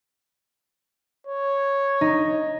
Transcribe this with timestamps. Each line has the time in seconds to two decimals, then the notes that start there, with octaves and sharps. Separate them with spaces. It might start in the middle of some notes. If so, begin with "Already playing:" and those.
1.27 C#5
2.01 D#4